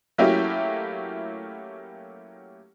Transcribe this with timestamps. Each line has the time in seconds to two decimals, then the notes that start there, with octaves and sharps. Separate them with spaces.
0.18 F#3 A3 A#3 C#4 E4 G4